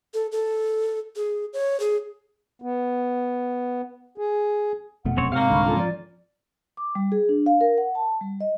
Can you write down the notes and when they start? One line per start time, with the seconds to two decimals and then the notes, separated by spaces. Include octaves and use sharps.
0.14 A4
0.32 A4
1.16 G#4
1.53 C#5
1.80 G#4
2.62 B3
4.18 G#4
5.05 F1 B2 A3 F#5
5.17 F#2 C4 C#5
5.32 G#2 C3 A#3 C4 C#5 F5
5.50 C2 D3 B5 C#6
5.64 C#4 F4 A4
5.77 F3 D5
6.77 D6
6.95 G3
7.12 G#4
7.29 D4
7.46 F5
7.61 A#4
7.78 F#5
7.95 A5
8.21 G3
8.41 D#5